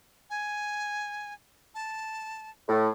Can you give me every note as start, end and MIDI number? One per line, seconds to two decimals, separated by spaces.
0.30 1.33 80
1.75 2.50 81
2.68 2.89 45